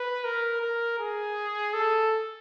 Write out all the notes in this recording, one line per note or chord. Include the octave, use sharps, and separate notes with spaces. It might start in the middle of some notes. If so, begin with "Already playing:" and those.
Already playing: B4
A#4
A#4
G#4
A4